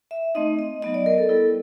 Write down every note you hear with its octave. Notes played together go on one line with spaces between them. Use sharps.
E5
A3 C4 D#4 D#5
D#5
F#3 B3 D#4 D#5
D5
A#4
A4
G3 B3 E4 A4